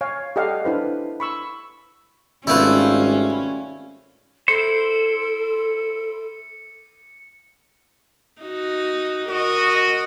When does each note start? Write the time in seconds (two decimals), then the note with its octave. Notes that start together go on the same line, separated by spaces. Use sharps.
0.01 C#5 F5 G#5
0.36 G4 A4 D5 D#5 F5 F#5
0.64 D4 E4 B4 C5
1.20 B5 C#6 E6
2.47 G#1 G3 A3 C#4 E4 F4 B4
4.48 E4 A4 C5 C#7
8.42 D#4 F#4
9.30 F#4 A#4 D#5